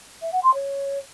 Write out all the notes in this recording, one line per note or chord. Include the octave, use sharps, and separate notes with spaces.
E5
F#5
C6
C#5